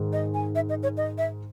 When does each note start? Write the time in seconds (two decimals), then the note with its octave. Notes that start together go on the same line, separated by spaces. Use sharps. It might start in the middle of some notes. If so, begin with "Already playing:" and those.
Already playing: G#2 D#3 G#3
0.13 D#5
0.34 G#5
0.55 E5
0.69 D#5
0.83 C#5
0.97 D#5
1.18 E5